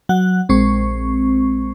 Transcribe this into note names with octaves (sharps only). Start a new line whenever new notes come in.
F#3 F#5 F#6
A#1 G#3 C4 C#6